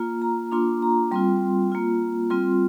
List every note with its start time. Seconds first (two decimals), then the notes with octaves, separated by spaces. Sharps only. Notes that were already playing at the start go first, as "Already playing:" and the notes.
Already playing: A#3 F4
0.22 A#5
0.52 A#3 D4 F4 C6
0.82 A#5
1.11 G3 C4 F4 C6
1.72 A#3 F4
2.30 G3 C4 F4 C6